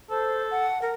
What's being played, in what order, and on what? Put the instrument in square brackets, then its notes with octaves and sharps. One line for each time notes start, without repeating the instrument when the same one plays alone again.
[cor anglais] A4 [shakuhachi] C5
[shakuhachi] F#5
A#4